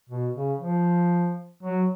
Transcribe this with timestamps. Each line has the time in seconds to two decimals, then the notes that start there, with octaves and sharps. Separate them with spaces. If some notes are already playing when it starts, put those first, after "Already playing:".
0.09 B2
0.35 C#3
0.60 F3
1.63 F#3